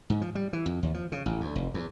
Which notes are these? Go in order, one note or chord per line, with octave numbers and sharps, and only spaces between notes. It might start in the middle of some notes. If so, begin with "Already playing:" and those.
G#2
F3
G3
E3
F2
D#2
F3
C#3
A1
D2
F1
E2